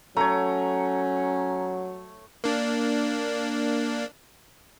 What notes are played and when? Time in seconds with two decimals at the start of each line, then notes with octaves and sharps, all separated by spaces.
0.17 F#3 A3 C#4 C#5 A#5
2.44 A#3 D4